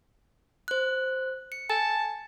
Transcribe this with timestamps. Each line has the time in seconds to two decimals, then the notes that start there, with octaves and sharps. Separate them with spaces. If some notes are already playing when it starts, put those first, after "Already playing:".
0.68 C5 F#6
1.52 C#7
1.69 G#5 A5